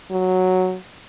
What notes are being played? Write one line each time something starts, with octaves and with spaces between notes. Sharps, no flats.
F#3